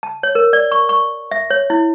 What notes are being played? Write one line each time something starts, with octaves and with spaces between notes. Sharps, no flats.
A5
C#5
A#4
D5
C#6
C#6
E5
C#5
E4